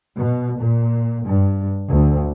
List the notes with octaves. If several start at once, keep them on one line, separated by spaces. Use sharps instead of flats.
B2
A#2
G2
D2